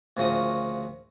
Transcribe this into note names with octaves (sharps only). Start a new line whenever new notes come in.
D2 A#2 C#3 F3 F#4 D#6